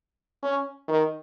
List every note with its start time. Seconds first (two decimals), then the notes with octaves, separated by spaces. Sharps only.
0.43 C#4
0.88 D#3